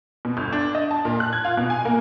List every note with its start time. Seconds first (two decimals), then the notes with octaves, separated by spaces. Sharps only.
0.25 B2
0.37 G1
0.53 D4
0.75 D#5
0.91 A5
1.05 A#2
1.20 F#6
1.33 G#6
1.45 F4
1.57 B2
1.70 G#5
1.85 A#3